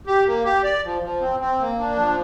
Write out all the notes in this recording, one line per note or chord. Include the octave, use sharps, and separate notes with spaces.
G4
A#3
G4
D5
F3
F3
C4
C4
A#3
D4
F3